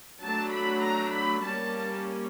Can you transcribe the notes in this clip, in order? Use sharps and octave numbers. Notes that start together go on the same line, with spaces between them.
F#3 A3 D4 A5
B5
A#5
B5
G3 A#3 C#4 A5